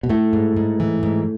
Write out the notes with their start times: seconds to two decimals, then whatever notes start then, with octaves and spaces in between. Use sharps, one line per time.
0.03 B2
0.09 A2 A3
0.33 G#2
0.57 G#2
0.80 E3
1.03 G#2